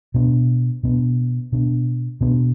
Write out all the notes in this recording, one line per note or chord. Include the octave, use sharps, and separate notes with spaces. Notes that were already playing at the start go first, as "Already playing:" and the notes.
B2 B3 D4
B2 B3 D4
B2 B3 D4
B2 B3 D4